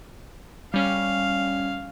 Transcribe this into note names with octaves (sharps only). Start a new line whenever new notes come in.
G3 C#4 F5